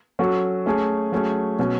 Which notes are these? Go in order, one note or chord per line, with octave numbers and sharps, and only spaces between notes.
F#3 C#4 F#4 A4
A3 C#4 G#4
F#3 A3 C#4 G#4
B2 F#3 C#4